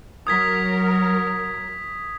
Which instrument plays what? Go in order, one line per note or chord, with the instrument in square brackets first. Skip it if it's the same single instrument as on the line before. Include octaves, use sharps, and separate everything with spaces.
[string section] F#3 A#4 [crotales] D#6 G#6 B6